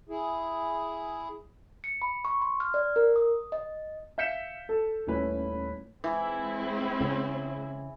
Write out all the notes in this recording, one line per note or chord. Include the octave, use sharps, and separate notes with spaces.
E4 G#4
C#7
B5
C#6
C6
F6
D5
A#4
D#6
D#5
E5 F5 G6 B6 C#7 E7
A4
D#1 A3 C#4 E4 B4
E3 G#3 C4 E4
C#3